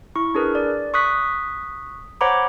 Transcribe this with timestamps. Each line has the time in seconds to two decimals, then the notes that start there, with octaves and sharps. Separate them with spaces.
0.16 E4 C#6
0.35 D4 G#4 A#4 B4
0.55 D5
0.94 C#6 D#6 F#6 B6
2.21 C5 C#5 F#5 A#5 B5 D6